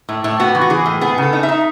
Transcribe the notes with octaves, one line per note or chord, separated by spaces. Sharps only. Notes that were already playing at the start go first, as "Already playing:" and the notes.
A2
A2
B3 F#4
E3
F#4
E3 G#4
A2
B3 G#4
C#3 A4
D#4
E5
D#4